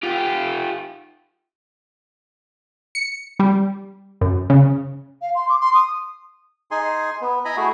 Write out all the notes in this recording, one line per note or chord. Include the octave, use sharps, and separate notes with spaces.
F4 G4
C#7
G3
F#2
C#3
F5
C6
D6
C6
D#6
D#4 G#4 G#5 C6
B3
E4 D#5 G#5 A#5 B5
A3 E4 F#4 G#4